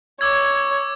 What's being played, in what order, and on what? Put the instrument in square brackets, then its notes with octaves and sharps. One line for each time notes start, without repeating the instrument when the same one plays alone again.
[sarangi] C#5 [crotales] D6 E6 G#6